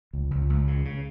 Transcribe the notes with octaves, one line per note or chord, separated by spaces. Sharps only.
C#2
C#2
C#2
C#3
C#3